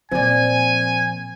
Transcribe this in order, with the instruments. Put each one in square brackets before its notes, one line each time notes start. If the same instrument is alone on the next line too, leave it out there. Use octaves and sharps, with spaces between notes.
[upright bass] A#2 F3 [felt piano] C4 D5 [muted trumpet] G#5